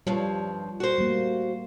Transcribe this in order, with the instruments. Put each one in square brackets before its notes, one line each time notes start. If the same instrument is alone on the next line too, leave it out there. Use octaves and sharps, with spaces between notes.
[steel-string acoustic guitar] G2 F3 [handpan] G3 C#5
[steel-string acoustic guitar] F#4 C5
[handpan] G3 A3 A#3